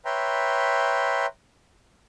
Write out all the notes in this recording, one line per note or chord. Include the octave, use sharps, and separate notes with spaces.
B4 C#5 E5 G5 A#5 C6